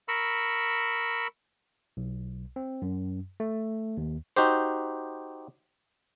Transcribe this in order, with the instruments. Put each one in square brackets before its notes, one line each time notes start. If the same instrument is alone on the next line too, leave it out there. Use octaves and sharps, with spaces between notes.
[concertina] A#4 B5 C#6 E6
[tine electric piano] B1
C4
F#2
A3
D#2
[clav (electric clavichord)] D#4 F#4 G4 C5